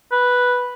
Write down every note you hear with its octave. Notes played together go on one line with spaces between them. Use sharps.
B4